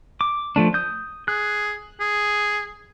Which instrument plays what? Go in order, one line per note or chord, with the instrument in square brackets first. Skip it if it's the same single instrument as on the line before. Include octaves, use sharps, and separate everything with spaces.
[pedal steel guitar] D6
F3 A3 D4
D#6 G6
[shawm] G#4 [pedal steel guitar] F#6
[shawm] G#4